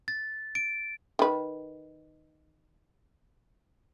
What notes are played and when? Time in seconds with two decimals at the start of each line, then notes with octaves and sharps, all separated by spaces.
0.08 A6
0.55 D7
1.19 D#3 B4